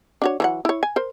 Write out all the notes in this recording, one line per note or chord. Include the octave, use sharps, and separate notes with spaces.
D4 F#4 C#5
E3 F#3 F#5
E4 C#5
G#5
A#4 C5